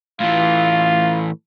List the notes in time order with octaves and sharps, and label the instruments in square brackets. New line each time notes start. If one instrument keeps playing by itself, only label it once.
[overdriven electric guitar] A2 E3 [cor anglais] F4